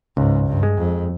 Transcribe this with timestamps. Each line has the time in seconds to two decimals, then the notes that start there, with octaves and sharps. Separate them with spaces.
0.17 C#2 G#2
0.47 G2
0.63 G#3
0.78 F2